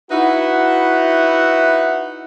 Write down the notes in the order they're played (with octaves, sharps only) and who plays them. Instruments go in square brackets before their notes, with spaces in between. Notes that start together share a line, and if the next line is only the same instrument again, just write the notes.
[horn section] D#4 E4 F#4 B4 E5 F#5